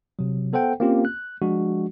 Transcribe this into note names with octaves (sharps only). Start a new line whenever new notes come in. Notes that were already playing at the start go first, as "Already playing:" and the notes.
C3 F#3
B3 A4 C5 F#5 G5
A#3 C4 C#4 F4 G4
F#6
F3 G#3 D4 F#4